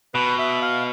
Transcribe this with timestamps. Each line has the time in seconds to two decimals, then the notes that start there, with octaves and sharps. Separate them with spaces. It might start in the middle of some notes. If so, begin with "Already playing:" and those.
0.14 B2 B4
0.38 E5
0.62 F5